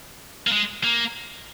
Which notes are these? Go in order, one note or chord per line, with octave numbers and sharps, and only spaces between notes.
A#3
G#3
A#3